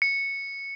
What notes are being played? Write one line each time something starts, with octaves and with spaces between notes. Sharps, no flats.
C#7